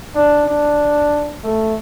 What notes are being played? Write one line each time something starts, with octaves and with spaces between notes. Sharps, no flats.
D4
D4
A3